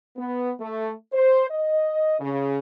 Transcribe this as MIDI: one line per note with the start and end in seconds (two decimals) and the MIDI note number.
0.17 0.52 59
0.60 0.92 57
1.13 1.48 72
1.50 2.18 75
2.19 2.59 49